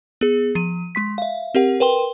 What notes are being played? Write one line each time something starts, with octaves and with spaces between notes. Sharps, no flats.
B3 G#4
F3 D#7
G#3 C6 B6
E5 F5
C4 G4 A#4 F#5
A#4 B4 G5 C6 G7